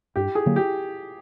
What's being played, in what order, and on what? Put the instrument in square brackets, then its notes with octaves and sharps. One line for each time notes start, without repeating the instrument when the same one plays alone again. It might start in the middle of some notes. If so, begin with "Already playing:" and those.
[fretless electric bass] G2 [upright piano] G4
[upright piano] G#4
[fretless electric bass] D3 F#3 A#3
[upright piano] G4